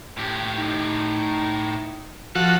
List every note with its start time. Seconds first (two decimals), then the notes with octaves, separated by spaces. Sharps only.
0.17 A2 G4
0.58 D#4
2.35 F3 F#4 A4